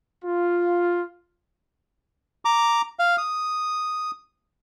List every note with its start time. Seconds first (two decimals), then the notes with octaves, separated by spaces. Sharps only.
0.25 F4
2.45 A#5 D6
2.99 F5
3.18 D#6